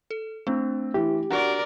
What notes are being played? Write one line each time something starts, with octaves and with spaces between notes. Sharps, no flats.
A4
A3 C4 D4
E3 G4
D4 F#4 A#4 D5 F#5 C#6